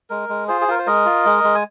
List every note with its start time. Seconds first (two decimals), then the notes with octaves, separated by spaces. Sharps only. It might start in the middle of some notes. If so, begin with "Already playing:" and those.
0.10 G#3 A#4
0.29 G#3
0.48 F4 G#4 C5
0.61 G#4
0.68 F4 A#4
0.79 C5
0.86 G#3 A#4 D#5
1.06 F4
1.26 G#3
1.44 G#3
1.55 G#5